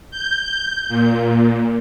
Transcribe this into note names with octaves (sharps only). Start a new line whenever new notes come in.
G6
A#2